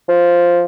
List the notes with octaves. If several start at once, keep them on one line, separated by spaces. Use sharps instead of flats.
F3